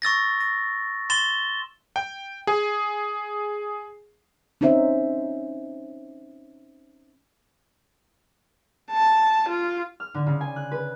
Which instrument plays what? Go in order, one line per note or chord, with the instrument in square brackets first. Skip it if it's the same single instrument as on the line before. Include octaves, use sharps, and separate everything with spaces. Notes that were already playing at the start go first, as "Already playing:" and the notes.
[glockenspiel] C#6 E6 A6 A#6
A#6
C6 A6 E7 G7
[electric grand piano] G5
G#4
[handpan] C4 C#4 D#4 C5 E5
[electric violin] A5
F4
[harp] F6
D3
C#3
G#5
F#6
B4